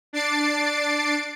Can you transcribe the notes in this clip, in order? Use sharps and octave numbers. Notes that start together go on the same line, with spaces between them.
D4 A6 C7 D7